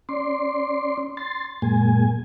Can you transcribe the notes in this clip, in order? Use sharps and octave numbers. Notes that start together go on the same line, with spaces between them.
C#4 D5 C6
C6 A6
F#2 A#2 G#3 A#3 G#5